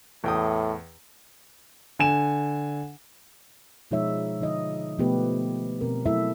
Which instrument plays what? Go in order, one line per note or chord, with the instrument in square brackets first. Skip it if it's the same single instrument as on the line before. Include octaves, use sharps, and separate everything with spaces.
[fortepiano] E2 G5 D#6 [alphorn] A2
[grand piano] D3 G#5 E7
[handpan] B2 F3 G#3 D#4 C#5 E5
D3 F3 D#4 D#5
B2 F3 A3 B3 G4 B4
B2 C4 A#4
F#3 A3 E4 A4 E5